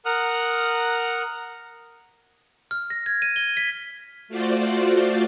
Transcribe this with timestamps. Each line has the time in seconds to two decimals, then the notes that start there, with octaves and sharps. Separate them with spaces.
0.06 A#4 F#5 D#6 F6 F#6
2.71 F6
2.90 A#6
3.06 G#6
3.22 D#7
3.36 G7
3.57 B6
4.28 A3 F4 F#4 C5 D5